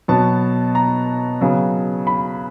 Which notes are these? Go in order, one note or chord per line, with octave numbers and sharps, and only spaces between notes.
B2 F#3 B3 A5
A#5
C#3 F#3 B3
B5